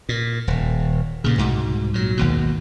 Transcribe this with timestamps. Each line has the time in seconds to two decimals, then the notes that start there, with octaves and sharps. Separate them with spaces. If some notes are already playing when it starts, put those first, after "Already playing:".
0.09 A#2
0.47 D#1
1.24 G2 A#2 C#3
1.38 C2 G#2 B2
1.94 A#2 F#3
2.17 G#1 D#2 B2